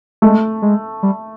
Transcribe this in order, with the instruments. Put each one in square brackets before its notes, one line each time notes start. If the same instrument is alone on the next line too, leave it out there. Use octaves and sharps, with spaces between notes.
[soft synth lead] G#3 [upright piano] A3
[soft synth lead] G#3
G3